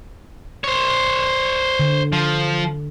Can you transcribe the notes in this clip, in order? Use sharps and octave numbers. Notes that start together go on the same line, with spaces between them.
C5 C#5
D3
F3